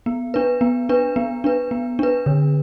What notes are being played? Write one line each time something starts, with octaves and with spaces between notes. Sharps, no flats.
B3
D4 B4
B3
D4 B4
B3
D4 B4
B3
D4 B4
D3